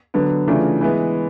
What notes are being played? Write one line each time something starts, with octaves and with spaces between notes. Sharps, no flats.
D3 F#3 B3
C#3 E3 A3 D4 F4
E3 G#3 B3